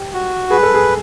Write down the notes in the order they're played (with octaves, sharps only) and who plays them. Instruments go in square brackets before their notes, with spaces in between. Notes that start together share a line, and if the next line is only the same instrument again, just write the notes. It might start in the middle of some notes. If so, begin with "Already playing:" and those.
Already playing: [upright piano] G4
[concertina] F#4
[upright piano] G#4 [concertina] B4
[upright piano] A4
G#4